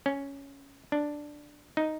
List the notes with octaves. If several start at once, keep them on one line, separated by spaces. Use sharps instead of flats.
C#4
D4
D#4